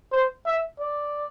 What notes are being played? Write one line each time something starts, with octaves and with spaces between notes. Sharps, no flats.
C5
E5
D5